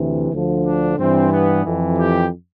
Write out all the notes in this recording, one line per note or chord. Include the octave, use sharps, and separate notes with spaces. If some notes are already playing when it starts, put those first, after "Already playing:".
Already playing: D2 C3 E3
D2 D3 F3
D4
G2 E3 C4
B3
F2 E3
G4